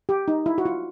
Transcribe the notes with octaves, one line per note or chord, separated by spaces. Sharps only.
G4
D#4
E4
F#4
F4